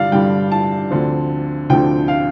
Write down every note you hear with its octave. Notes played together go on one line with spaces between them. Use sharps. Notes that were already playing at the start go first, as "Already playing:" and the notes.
Already playing: G2 D3 G3 D5 F5
G2 D3 G3 G5
A5
D2 D3 F3 C4
D2 D3 F3 C4 G5
F5